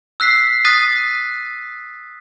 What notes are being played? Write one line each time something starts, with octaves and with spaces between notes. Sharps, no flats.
E6 F#6 B6 C7
D#6 F#6 A6 B6 D#7